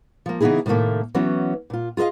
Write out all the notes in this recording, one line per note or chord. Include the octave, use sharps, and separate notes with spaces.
F3 A#3
C#3 E3 B3 D#4 E4 G#4
A2 C3 D#3 F#3 A3 A#3
E3 F#3 B3 C#4
A#2 F4
F4 G#4 A4 D#5 F5